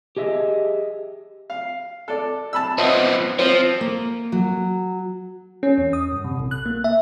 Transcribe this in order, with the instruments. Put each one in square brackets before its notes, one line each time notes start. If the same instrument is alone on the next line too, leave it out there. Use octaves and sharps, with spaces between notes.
[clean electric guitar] G4 G#4 D#5 E5
[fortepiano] F5
A4 D5
A5 B5 E6
[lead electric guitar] F3 B3 [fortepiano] C4 D#5 E5
[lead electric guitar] F3 [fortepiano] C4
[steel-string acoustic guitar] A#3
F#3
[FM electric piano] C#4
E2
D#6
G2
C3
A#1
F#6
A#3
E5